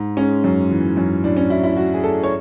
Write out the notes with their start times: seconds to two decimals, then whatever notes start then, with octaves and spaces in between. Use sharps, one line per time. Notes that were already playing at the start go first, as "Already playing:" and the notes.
Already playing: G#2
0.17 G#3 C#4
0.44 F#2
0.71 E3
0.97 F#2
1.24 A2 D4
1.37 C#4
1.50 F#3 E4
1.63 E4
1.77 F#3 F#4
1.94 G#4
2.03 A2 A4
2.23 C#5